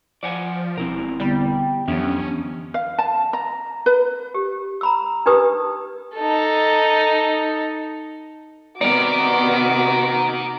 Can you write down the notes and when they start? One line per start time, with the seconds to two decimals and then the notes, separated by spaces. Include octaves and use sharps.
0.23 F3 D5 F#5 G#5
0.78 E1 C4 E4 A#4
1.20 D3 G3 B3
1.88 F2 E3 F#3 B3 C#4 D4 G4
2.74 F5
2.98 A5
3.33 A#5
3.86 B4
4.34 G4
4.81 A#5 B5 E6
5.26 D4 D#4 G4 B4 D#6 E6
6.16 D#4 A4
8.81 C3 B3 D#4 F#4 A#4 D5 D6